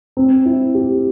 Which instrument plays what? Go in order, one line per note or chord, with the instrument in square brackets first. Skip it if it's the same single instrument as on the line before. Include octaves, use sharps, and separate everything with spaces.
[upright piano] C4
E4
G4